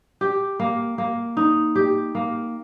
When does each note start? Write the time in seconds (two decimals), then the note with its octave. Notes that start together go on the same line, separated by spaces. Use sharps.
0.21 G4
0.60 A#3
0.98 A#3
1.37 D#4
1.75 G4
2.15 A#3